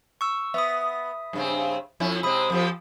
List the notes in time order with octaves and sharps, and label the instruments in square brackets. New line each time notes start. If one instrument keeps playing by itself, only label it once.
[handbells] C#6 E6
[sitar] B3 [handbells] E5 D#6
[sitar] G2 C#3 C4
F2 C#4 E4
[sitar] C3 G#3 C4 [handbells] B5 D#6
[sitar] F2 F3 G4